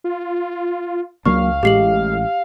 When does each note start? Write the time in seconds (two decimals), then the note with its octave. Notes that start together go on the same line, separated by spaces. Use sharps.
0.04 F4
1.26 C#2 F#3 A#3 D4 F5 C#6
1.63 A1 A2 G#3 G4 C7 F#7